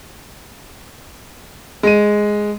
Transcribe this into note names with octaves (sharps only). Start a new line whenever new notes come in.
G#3 D#7